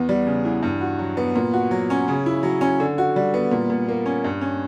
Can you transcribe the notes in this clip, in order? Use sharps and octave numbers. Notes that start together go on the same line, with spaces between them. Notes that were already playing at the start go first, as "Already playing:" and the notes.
Already playing: E2 B3
G3
C#3
E3
G2
F#4
F#3
B3
A#2
F#4
F#3
C#4
C#3
E4
F#3
C#4
D3
F#4
G3
B3
A#2
A#2
A#3
C#4
G2
C#4